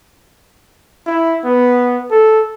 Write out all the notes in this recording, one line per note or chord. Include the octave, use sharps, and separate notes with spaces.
E4
B3
A4